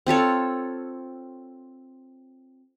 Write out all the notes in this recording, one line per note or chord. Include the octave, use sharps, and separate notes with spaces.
C4 F4 A4 C#5